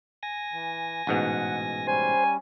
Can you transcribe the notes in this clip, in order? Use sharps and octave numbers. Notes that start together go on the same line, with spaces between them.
G#5 A#6
E3
A1 G#2 B2 F#5
G3 C#4 C5 G#5